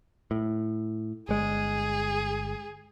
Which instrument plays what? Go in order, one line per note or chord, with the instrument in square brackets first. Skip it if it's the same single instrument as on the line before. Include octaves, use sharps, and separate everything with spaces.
[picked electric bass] A2
[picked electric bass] G1 G#3 [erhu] G#4